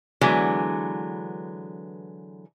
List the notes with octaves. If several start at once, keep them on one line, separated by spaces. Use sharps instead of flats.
D3 E3 F#3 G#3 B3